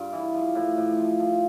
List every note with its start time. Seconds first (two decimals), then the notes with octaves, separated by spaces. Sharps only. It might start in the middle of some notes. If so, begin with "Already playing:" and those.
Already playing: G2 F4
0.13 E3
0.35 F3
0.55 A2
0.77 A2
0.98 F3
1.20 F3